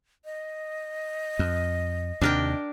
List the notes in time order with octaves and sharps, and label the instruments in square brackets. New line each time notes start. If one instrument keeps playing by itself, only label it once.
[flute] D#5
[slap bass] F2
[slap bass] D#2 C3 [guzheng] D4 A#4 G5